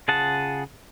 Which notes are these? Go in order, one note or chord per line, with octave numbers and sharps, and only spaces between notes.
C#3 F4 G#4 F#5 A5